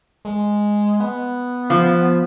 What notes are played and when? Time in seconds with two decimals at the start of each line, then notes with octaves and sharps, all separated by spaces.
0.25 G#3
1.00 B3
1.70 F3